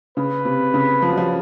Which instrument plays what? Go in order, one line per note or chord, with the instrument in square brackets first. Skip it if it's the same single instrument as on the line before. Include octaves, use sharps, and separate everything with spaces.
[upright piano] C#3 [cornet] B4
[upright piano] C3
C#3
F3
F#3
F3